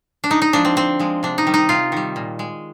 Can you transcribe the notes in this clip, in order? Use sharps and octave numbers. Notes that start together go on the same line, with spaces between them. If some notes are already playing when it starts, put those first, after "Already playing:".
D4
D3 D#4
D#4
F3 G#3 D4
C4
D3 C4
F3 G#3
C3 D4
D#4
D#3 G3
D#4
C3 F4
D#3 G3
A#2
G#3